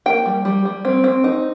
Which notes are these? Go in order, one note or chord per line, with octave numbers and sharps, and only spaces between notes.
A#3 G5
G3
G3
G3
C4
C4
D#4